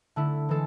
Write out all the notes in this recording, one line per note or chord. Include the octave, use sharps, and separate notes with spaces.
D3 A3 E4
E3 G#3 A4